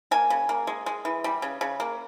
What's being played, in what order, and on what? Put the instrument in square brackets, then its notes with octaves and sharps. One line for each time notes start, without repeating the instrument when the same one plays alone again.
[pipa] A#3 G#5
C#3
A#3
G#3
G#3
E3
G3
C#3
C#3
A#3